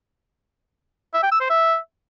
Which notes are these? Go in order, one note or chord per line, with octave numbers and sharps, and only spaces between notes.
E5
G5
E6
C5
E5